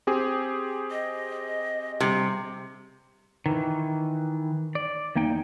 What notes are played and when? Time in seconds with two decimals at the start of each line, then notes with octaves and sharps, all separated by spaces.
0.07 C4 G4 G#4
0.91 D#5
2.00 C3 G3
3.46 D#3 E3
4.75 D5
5.15 E2 A#3 D#4 G5